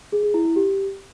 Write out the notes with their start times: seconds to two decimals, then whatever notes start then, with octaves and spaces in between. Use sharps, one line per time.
0.12 G#4
0.23 G#4
0.34 E4
0.45 E4
0.56 G4